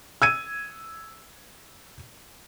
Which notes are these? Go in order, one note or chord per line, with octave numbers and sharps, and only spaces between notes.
E6 G#6 D#7